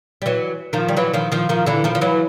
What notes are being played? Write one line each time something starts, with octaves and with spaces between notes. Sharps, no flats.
G3
E3 F#3
D#3 F3
G3
E3 F#3
D#3 F3
D#3 F3
D#3 F3
D3 E3
D#3 F3
F3
E3 F#3